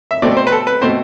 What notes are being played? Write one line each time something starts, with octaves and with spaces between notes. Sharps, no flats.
E5
B2 A3 C4 D5
C5
B4
A4
B4
B2 A3 C4 C5